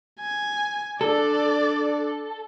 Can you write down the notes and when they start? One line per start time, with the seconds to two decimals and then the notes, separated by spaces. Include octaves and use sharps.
0.20 G#5
1.01 D4 A4 D5